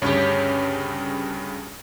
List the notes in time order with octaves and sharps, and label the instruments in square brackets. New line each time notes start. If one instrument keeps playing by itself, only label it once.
[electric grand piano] D2 G2 C#3 [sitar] G4 C#5